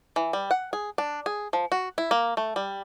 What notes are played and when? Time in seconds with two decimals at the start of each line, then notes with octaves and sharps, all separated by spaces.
0.16 E3
0.33 G3
0.51 F#5
0.73 G#4
0.98 D4
1.26 G#4
1.53 F3
1.72 F#4
1.98 E4
2.11 A#3
2.37 A3
2.56 G3